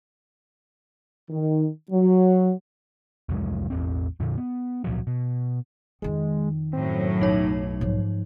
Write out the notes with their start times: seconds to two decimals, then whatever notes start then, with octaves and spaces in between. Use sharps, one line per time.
1.29 D#3
1.90 F#3
3.29 C2 F2 F#3 G#3
3.70 A1 E2 C4
4.20 F2 A#2 D3 F3
4.38 B3
4.84 C#2 A#2 F3 F#3
5.07 B2
6.02 F2 D#3 G#3
6.73 F#2 A2 F#3 C4
7.21 B1 D#4 C#5
7.81 G#2 F3